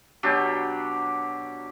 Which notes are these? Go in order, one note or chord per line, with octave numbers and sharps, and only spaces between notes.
B2 F#3 D4 G4